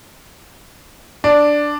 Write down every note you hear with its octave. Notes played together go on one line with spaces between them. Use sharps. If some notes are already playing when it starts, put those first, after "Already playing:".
D4